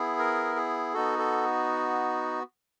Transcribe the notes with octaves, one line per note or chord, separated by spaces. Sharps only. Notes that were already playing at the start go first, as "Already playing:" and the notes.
Already playing: B3 E4 G#4
A#4
G#4
B3 D#4 F#4 A4
A4